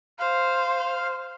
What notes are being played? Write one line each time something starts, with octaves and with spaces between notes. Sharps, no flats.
C5 F5